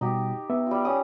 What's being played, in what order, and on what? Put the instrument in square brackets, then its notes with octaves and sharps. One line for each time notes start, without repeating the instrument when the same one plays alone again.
[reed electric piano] B2 G3 F#4 [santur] D#4 G4
[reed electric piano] B3 E5
[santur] G3 F4
C#4 D#6